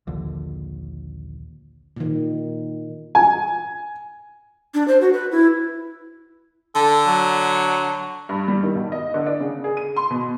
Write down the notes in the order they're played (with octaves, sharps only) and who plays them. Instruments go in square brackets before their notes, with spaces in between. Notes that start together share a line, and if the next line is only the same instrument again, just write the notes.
[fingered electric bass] A#1 D#2 D3
[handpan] A#2 D#3
[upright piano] G#5
[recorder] D4
C5
F#4
B4
E4
[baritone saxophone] D3 [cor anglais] A4
[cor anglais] F#3
[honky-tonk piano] G2
G3
D#3
B1
D#5
D3
D4
C#3
G#4
D#7
C6
B2